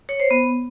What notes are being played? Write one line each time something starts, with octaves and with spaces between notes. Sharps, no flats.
C#5
C5
B3